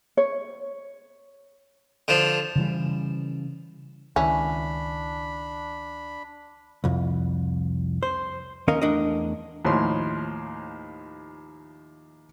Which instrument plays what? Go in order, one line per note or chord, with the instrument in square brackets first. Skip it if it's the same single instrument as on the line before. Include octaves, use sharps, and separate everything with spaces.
[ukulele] C#5
[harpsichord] D3 F3
[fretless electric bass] C#3 E3 G3
[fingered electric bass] C#2 D#3 [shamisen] E3 C#4 [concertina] D4 B5
[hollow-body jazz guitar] C2 F2
C5
D#2 C#4 A#4 D#5 F5
E2 A3 D4 A#4 D#5
[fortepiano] D#2 A2 F3 C#5 C6